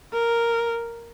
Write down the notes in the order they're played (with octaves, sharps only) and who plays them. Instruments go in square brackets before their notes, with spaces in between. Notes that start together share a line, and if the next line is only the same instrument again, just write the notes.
[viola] A#4